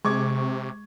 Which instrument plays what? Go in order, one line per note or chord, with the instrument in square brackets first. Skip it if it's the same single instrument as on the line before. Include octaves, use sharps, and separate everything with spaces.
[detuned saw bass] C3 [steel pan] G#3 [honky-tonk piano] C#6 D6 G#6